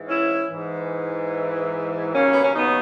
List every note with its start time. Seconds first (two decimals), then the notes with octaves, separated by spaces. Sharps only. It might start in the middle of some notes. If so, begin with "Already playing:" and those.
Already playing: G#2 E3
0.08 C#4 E4
0.50 G#2 E3
2.13 D#2 C#3 F#3 A#3 C#4
2.31 B3
2.43 C#4
2.54 B3 D#4